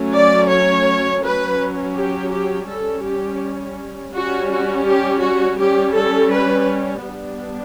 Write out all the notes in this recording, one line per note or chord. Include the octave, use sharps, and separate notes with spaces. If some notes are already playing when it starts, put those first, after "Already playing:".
Already playing: F#3 A3 C#4
D5
C#5
F#3 C#4 B4
G4
G4
G3 C#4 A4
G4
G3 C#4 F#4
F#4
G4
F#4
G3 C#4 G4
A4
B4
G3 B3 D4